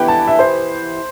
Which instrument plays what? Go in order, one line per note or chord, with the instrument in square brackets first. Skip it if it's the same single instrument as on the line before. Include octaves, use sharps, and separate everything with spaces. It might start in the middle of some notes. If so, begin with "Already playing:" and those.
Already playing: [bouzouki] E3 B3 E4 G4 [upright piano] G5
[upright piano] A5
E5
C5